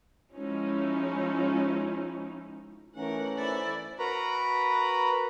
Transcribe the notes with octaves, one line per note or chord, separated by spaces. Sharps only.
F3 G#3 C#4 D#4 E4
E3 A3 C#4 D#4 A#4 F#5
E4 C5 D5
F#4 A#4 B4 A#5 B5